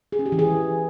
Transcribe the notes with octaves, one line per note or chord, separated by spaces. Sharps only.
G#4
C#4
G4
E3
G#4